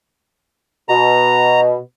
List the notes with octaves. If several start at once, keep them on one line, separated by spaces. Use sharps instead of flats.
B2 A#5